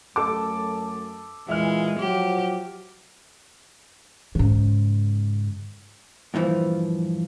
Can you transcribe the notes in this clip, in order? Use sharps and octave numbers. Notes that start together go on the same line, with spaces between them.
F#2 A3 A4 A5 D6
A#2 E3 G#3 E5 F6
F3 F#3 F#4 G4
G#2 C#3
G2 A#2 E3 F3